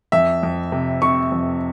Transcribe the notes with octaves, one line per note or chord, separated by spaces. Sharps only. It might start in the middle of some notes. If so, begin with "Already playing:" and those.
F2 E5
F2
C3
C3 C#6
F2